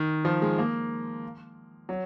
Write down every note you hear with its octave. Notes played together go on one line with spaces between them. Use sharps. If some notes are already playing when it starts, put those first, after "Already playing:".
Already playing: D#3
F3
G#3
A#3
F#3